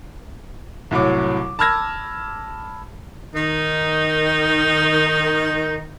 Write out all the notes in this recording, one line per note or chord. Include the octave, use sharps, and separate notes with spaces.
C2 A2 F#3 D6
A5 B5 E6 F6 G#6 A#6
D#3 D#4